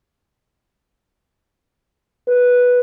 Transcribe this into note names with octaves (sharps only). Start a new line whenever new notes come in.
B4